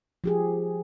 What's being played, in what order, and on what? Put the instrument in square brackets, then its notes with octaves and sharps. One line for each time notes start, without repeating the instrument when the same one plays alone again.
[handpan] F3 G4 G#4